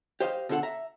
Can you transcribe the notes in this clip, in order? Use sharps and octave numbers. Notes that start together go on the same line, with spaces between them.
G4 C5 D#5 F5
B2 D3 F4 A4 F#5
E5 A#5